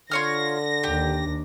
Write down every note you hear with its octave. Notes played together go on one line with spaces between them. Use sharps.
D3 F4 C#5 F6 A#6
D#2 D4 G4